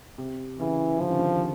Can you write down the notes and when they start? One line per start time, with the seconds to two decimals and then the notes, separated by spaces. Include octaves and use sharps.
0.18 C3
0.60 C#3 E3
1.01 D3 F3
1.10 D#3
1.19 D3